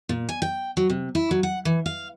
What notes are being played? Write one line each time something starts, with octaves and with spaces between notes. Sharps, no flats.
A#2
G#5
G5
F#3
C3
E4
F#3
F#5
E3
F5